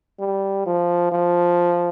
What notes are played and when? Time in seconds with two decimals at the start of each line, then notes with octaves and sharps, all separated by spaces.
0.20 G3
0.66 F3
1.12 F3